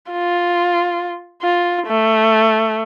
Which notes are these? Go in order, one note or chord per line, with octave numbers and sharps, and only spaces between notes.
F4
F4
A3